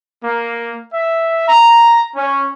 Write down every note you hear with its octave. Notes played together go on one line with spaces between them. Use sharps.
A#3
E5
A#5
C#4